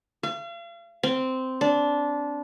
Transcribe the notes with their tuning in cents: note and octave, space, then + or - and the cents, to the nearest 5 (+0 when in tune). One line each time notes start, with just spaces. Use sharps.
F5 -40
C4 -10
D4 -15